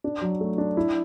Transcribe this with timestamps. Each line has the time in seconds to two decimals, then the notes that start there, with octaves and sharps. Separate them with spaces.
0.04 D4
0.21 F#3
0.41 A3
0.58 D4
0.77 E4